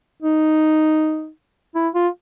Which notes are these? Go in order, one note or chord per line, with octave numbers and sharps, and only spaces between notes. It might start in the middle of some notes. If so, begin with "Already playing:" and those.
D#4
E4
F4